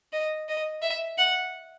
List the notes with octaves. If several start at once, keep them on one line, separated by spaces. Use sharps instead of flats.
D#5
D#5
E5
F#5